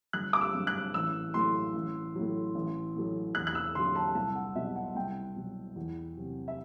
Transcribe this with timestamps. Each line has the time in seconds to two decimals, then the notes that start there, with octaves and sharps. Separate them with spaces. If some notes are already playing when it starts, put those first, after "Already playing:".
0.13 G1 F#6
0.33 D6
0.41 E6
0.54 G2 F#3
0.67 F#6
0.94 A1 E6
1.34 A2 F#3 C6
1.74 A1
2.15 A2 F#3
2.55 A1
2.96 A2 F#3
3.35 E2 F#6
3.47 F#6
3.55 E6
3.75 D3 F#3 C6
3.95 A5
4.15 C2 A5
4.35 F#5
4.55 B2 F#3 E5
4.76 F#5
4.95 C2 G5
5.36 B2 F#3
5.76 E2
6.17 C3 F#3
6.48 E5